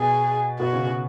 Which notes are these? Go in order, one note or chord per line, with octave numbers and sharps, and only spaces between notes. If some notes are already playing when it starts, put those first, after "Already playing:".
Already playing: B2 B3 G#4
B2 B3 F#4
C#3 C#4
C#3 C#4